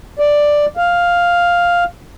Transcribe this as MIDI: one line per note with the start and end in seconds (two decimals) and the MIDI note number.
0.19 0.66 74
0.77 1.84 77